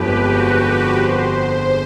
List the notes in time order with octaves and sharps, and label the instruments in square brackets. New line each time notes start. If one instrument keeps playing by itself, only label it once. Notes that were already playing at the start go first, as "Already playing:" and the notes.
Already playing: [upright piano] G1 F2 D3 F3 G#3 [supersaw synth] G4 B4
[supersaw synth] F#4
F#4
C5